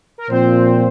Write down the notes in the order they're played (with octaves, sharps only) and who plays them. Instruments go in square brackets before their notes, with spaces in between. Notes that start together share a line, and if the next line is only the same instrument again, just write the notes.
[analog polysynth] A#4
[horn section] A#2 F3 C4 [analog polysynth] C5